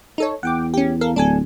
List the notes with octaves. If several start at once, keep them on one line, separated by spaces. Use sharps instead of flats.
D#4 A4 C#5
E2 F#5 G5 D6
C#4 G4
A4 A#4 F5
D1 D4 A4 G#5